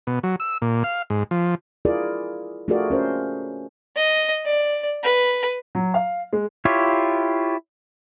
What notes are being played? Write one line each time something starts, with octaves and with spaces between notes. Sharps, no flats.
B2
F#3
E6
A#2
F5
G#2
F3
E4 F4 G#4 A#4 D5
A3 F4 F#4 G#4 A#4 D5
C#4 A#4 C5
D#5
D5
B4
F#3
F5
G#3
E4 F4 G4 C#5